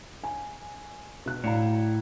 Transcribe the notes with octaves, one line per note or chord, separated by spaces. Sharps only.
G#5
B2 F#6
A2 D5 F5 A#5